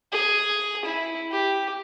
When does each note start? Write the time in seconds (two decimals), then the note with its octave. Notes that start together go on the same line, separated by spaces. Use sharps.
0.12 G#4
0.85 E4
1.31 G4